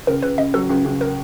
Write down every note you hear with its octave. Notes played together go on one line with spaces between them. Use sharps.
C#2 A#4
C#2 B4
C#3 D#5
F#3 A4
C#2
C#2
A#4